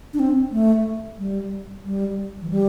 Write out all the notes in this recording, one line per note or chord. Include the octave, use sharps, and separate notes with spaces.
D4
C4
A3
G3
G3
E3
G3